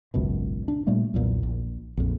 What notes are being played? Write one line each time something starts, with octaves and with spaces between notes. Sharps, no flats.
G#1 C#2 F#2 B2
D4
A#2 G3 A3 A#3
B1 E2 A#2
A#1
A#1 F2